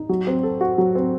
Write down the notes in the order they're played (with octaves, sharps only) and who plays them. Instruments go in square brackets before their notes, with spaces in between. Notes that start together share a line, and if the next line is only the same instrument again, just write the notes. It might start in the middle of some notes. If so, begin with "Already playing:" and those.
Already playing: [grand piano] D#4
F#3
C4
A4
F#4
F#3
C4